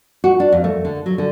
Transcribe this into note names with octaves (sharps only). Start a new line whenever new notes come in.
F#4
D4
F2
A3
D3
F#3
D3